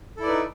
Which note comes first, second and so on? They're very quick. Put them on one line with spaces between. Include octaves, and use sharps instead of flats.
A4 E4 D5 B4 D#4